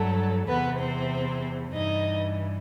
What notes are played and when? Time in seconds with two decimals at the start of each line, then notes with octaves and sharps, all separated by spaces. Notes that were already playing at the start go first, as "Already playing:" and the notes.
Already playing: G2 F#3 A3 A4
0.48 E2 C3 E3 B3 B4
0.79 C4 C5
1.73 G2 E3 D#4 D#5